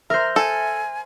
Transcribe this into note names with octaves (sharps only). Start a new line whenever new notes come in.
A#4 C5 E5 A#5
A4 G#5